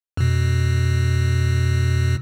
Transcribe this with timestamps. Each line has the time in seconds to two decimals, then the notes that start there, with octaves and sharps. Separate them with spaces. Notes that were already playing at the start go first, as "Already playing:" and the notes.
0.17 F2 B2